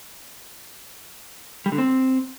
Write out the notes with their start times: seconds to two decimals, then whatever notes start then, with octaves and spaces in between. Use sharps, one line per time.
1.66 G3
1.72 D3
1.78 C4